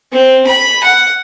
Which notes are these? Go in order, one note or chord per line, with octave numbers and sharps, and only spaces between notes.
C4
B5
F#5